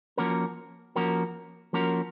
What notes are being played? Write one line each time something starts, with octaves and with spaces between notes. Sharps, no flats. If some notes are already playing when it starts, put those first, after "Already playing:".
F3 A#3 C#4 F#4 A#4
F3 A#3 C#4 F#4 A#4
F3 A#3 C#4 F#4 A#4